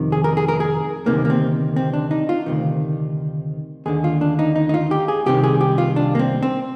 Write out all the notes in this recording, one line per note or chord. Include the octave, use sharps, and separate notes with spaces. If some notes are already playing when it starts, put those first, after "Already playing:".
Already playing: F2 C3 D#3
G#4
A#4
G#4
A#4
G#4
D2 C3 D#3 A#3
A#3
C4
C4
D4
D#4
F4
D2 C3 D#3
D#2 D3 G#4
F4
D4
D#4
D#4
D#4
F4
G4
G#4
C2 C3 D#3 G4
G#4
G4
F4
D4
A#3
C4
C4